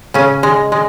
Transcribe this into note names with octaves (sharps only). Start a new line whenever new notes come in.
C#3 C#4
G#3
G#3